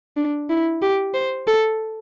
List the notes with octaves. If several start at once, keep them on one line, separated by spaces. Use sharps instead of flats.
D4
E4
G4
C5
A4